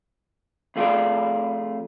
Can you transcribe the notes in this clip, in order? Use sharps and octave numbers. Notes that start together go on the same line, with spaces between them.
F2 A3 F4 G4 G#4 D5